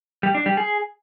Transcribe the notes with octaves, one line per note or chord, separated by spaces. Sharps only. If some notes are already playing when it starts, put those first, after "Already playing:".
G3
D4
G3
G#4